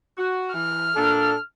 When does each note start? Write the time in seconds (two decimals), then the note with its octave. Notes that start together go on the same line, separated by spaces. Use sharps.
0.18 F#4
0.53 E3 F6
0.96 A#2 D4 A4